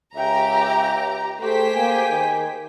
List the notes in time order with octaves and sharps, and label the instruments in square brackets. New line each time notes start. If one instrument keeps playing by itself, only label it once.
[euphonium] C#2 [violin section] G4 A#5 [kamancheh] E5 G5
[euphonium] A3 [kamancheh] G4 G#4 [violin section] C5 G5 B6
[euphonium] A#3 [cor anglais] G#5
[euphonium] D#3